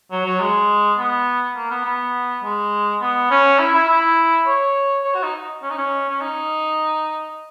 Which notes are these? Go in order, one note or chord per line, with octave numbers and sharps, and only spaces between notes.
F#3
F#3
G#3
B3
A#3
B3
B3
G#3
B3
C#4
E4
E4
E4
C#5
C#5
F#4
D#4
C#4
D#4
C#4
C#4
D#4